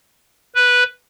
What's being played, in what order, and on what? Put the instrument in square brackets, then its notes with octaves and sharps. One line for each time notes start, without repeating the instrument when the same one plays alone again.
[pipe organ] B4